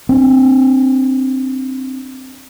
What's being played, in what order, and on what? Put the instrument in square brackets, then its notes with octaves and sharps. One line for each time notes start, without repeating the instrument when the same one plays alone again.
[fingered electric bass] C4 D4